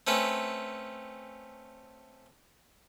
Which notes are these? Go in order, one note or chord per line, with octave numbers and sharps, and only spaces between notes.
A3 C4 C#4 B4